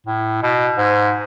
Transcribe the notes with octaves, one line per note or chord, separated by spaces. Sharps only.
A2
B2
G#2